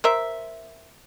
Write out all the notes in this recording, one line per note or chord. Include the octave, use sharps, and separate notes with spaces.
A#4 C5 E5